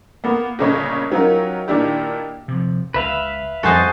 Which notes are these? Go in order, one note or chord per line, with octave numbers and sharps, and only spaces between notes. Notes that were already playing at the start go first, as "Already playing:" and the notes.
A#3 B3
G1 A#2 C#3 C#4 C#5 D#5
F#3 C#4 D#4 F4 G4 A#4
A#2 D#3 A#3 D4 E4 G4
C3 F3
C#2 B4 E5 F5
F2 G3 F#4 A4 C5 D#5 G#5 A5